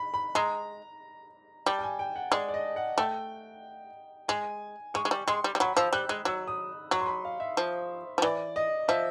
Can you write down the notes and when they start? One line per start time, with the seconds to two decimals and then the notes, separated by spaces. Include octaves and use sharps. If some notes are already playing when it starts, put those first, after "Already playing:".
Already playing: B5
0.14 B5
0.35 G#3 A#5
1.66 G3 A5
1.79 G5
1.84 G#5
1.99 G5
2.16 F#5
2.32 G#3 D5
2.48 D5
2.54 D#5
2.76 F#5
2.98 A3 G5
4.28 G#3 G#5
4.94 G#3 C#6
5.05 G#3
5.11 G3
5.28 G#3 C6
5.44 G3
5.55 G3
5.60 F#3 B5
5.77 F3 E6
5.93 G3 F#6
6.09 G#3 F#6
6.25 F#3 E6
6.48 D#6
6.91 F#3 C#6
7.01 C6
7.07 B5
7.25 F5
7.40 E5
7.57 F3
8.18 F3
8.22 E3 D5
8.56 D#5
8.88 F3 E5